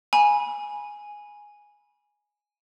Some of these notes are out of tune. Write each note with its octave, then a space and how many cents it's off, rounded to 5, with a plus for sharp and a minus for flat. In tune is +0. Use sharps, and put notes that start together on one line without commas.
G#5 +0 B5 -30